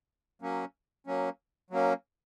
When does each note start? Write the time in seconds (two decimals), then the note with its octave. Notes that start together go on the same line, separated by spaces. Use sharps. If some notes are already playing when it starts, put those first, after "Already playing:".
0.42 F#3 A#3 C#4
1.07 F#3 A#3 C#4
1.70 F#3 A#3 C#4